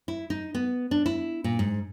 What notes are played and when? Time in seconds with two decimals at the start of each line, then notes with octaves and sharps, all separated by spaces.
0.08 E4
0.30 D#4
0.55 B3
0.91 D4
1.06 E4
1.44 A#2
1.59 G#2